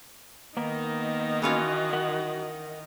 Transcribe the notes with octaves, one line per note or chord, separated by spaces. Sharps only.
D#3 A#3 B3 D#4 A#4
E3 C#4 F4 F#4
A#4 F#5